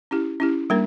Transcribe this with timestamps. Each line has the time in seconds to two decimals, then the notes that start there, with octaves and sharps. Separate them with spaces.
0.11 C#4 E4 G4
0.40 C#4 E4 G4
0.70 G3 A#3 D4 A#4